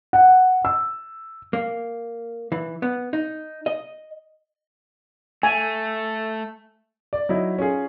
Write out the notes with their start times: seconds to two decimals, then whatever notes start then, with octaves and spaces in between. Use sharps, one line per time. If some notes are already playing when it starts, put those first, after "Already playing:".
0.13 F#5
0.65 E6
1.53 A#3
2.52 E3
2.82 B3
3.13 D#4
3.66 D#5
5.43 A3 G#5
7.13 D5
7.29 F#3 D#4 E4
7.58 C#4 F4 G#4